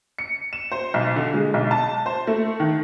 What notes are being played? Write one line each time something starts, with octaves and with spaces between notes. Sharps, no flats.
C#7
E7
C5
B1
D3
G#3
B1
A5
C5
A3
D#3